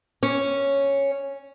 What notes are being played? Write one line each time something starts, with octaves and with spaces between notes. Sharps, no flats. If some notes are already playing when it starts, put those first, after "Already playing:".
C#4